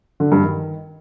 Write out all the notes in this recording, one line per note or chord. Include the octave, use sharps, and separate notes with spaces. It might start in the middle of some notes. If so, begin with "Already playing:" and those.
D3
G2
D#3